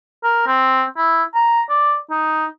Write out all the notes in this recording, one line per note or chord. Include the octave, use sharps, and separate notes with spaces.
A#4
C4
E4
A#5
D5
D#4